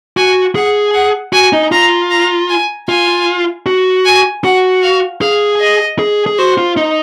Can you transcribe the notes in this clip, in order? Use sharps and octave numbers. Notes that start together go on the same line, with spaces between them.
F#4 G#5
G#4 F#5
F#5
F#4 G#5
D#4
F4 A#5
A#5
G#5
F4 G#5
F#4
G#5
F#4 F#5
F5
G#4 F5
D#5
G#4
G#4
F#4 C5
F4
D#4